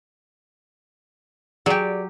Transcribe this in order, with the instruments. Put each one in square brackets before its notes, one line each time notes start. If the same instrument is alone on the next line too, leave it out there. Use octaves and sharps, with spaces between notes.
[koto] F#3 G4 [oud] G#4 D5